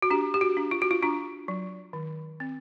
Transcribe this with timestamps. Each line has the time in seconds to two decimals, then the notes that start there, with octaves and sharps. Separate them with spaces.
0.02 F#4
0.10 D4 G4
0.34 G4
0.41 F#4
0.57 D4
0.71 F4
0.82 F#4
0.91 F4
1.03 D4 F4
1.48 F#3
1.93 D#3
2.40 C4